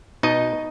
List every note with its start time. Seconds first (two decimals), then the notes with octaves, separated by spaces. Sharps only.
0.23 B2 D#4 D#5